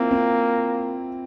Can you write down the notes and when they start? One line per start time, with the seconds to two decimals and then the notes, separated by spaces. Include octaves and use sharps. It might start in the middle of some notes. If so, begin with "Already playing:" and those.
Already playing: A#3 C4 E4 F4
0.11 C4